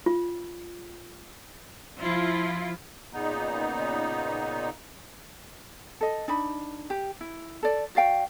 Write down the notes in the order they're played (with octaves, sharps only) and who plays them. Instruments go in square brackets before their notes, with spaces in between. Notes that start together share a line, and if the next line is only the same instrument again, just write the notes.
[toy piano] F4
[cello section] F3 E4 F4
[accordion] A#2 C#3 B3 D#4
[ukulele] A4 D#5
D4 D#4 B5
G4
E4
A4 D5
F#4 D5 F5 G5